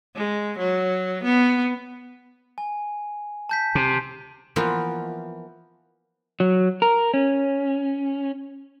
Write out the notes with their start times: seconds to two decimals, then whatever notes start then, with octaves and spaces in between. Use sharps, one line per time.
0.15 G#3
0.58 F#3
1.23 B3
2.58 G#5
3.49 A5 G6 B6
3.75 C3
4.56 E3 F3 A#3 B3 F4
6.40 F#3
6.82 A#4
7.14 C#4